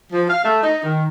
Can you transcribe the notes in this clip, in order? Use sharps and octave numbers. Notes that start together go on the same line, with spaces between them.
F3
F5
A3
D#4
D#3